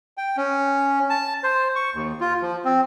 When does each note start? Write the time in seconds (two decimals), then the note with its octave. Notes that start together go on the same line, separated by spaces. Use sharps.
0.17 G5
0.37 C#4
1.10 A5
1.43 C5
1.75 C#6
1.94 D#2
2.20 F4
2.42 F3
2.65 C4